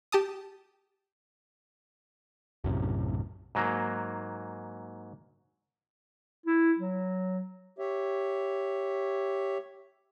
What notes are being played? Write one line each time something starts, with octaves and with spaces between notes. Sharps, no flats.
G4 A5 D#6
B1 F#2 A2 C3
G#2 F#3 A#3
E4
F#3
G4 C#5 E5